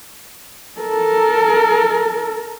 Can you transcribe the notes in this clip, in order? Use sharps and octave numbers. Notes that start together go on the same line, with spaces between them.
A4 A#4